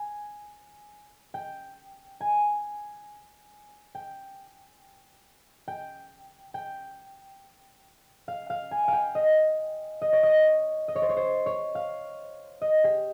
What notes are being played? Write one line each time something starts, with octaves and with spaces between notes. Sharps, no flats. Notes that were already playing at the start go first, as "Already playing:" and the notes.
Already playing: G#5
G5
G#5
G5
G5
G5
F5
F5
G#5
F5 G5
D#5
D#5
C#5
D#5
D#5
C#5
C5
C#5
C5
C#5
F5
D#5
G4